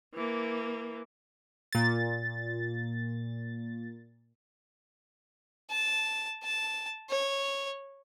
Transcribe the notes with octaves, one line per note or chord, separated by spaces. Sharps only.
E3 A#3
A#2 A6
A5
A5
C#5